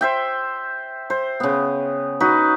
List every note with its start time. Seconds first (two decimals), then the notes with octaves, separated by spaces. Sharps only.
0.01 C5 E5 G5
1.10 C5
1.40 C#3 B3
2.20 D#4 F#4 B4